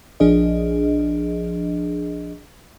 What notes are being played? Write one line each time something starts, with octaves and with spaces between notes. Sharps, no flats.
A#1 F3 D4 G#4 D#5